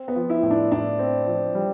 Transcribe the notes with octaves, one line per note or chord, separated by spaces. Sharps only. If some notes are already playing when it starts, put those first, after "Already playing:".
Already playing: C4
B3
F3
E4
A2
D4
A2 D4
C4
F3
G3